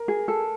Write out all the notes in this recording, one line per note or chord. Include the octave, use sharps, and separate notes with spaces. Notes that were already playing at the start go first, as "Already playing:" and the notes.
Already playing: A#4
G#4
A4